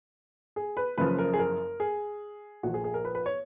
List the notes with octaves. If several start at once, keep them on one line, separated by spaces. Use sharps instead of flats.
G#4
B4
F#1 F#2 C#3 F3 B4
A#4
G#4
A#4
G#4
A#1 A#2 F3 F#4
G#4
G#4
A#4
B4
B4
C#5